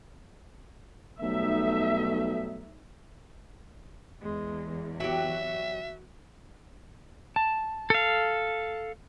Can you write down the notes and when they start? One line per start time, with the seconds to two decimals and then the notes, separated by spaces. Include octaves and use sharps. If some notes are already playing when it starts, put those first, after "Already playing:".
1.22 B1 F#3 G3 A3 D#4 E5
4.22 E2 G#3
5.00 F#3 F#4 G4 E5
7.36 A5
7.90 A4 F5